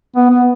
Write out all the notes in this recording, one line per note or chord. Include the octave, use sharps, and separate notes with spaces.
B3
B3